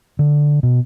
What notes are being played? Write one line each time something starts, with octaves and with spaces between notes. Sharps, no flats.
D3
B2